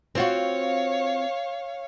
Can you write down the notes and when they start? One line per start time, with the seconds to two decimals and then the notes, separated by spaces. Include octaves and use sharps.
0.15 C4 F4 F#4 C#5 F5